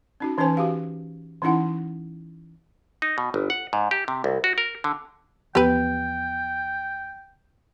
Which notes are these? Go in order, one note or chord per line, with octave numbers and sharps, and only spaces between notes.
C#4 D#4 F#4
E3 C#4 D#4 B4 C5 G#5
F#4 G4 F5
E3 C#4 D#4 E4 F#5
D#4
B2
G1
F#5
G#2
G4
C3
C2
F#4
A#4
D3
E2 F3 B3 G4 B4 G5